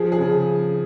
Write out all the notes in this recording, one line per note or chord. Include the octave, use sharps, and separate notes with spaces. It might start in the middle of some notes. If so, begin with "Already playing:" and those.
Already playing: F3 G#4
G#4
C#3